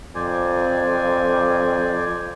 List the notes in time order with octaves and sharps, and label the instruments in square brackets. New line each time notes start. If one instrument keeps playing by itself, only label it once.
[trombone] F2 [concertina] C5 D5 G#5